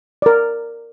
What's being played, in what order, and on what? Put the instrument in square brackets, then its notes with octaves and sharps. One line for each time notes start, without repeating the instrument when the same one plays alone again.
[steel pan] A#4 D5